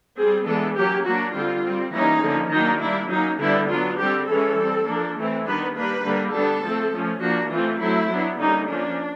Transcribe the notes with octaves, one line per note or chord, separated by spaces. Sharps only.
G3 C4 G#4
E3 G#3 B3 D4 A4
F#3 A#3 C#4 G4
F#3 A#3 D4 F#4
D3 G3 C4 F4
G3 C4
E3 G3 A#3 C#4 D#4
D3 F3 A#3 C#4
D#3 F#3 A#3 D4 D#4
G3 A#3 D4 E4
F#3 A#3 C#4 D#4
D3 G3 B3 D4 E4
F#3 B3 D4 F4
D3 G3 C4 G4
E3 G#3 C#4 A4
G3 C4
F3 A#3 D4
E3 A3 C4
D#3 G3 B3 D4 B4
G3 A#3 D4 B4
D3 G3 A#3 D4
G3 B3 D4 A4
F3 A3 C4
F3 A3 C#4
F3 A#3 D4 F#4
E3 A3 C4 F4
F#3 A3 C4 E4
F#3 B3 D4
D3 G3 A#3 C#4 D#4
F3 A#3 C#4 D4